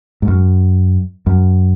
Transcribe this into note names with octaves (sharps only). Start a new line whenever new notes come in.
G#2
F#2
F#2